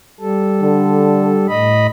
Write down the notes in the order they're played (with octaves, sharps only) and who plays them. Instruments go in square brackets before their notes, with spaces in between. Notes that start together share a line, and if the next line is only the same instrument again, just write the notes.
[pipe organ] G3 A4
[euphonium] D3
[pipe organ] A2 D#5 B5